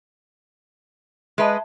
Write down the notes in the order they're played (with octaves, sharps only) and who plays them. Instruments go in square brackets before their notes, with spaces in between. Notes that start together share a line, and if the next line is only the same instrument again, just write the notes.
[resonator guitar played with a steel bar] G#3 B4 D#5 [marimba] E5 A5